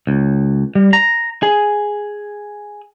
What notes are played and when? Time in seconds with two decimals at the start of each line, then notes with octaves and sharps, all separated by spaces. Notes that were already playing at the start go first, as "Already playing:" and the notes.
0.07 C#2
0.75 G3
0.93 A#5
1.43 G#4